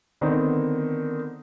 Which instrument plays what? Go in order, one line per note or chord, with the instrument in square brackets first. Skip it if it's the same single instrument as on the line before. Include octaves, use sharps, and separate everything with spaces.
[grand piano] D3 D#3 B3 C4 D#4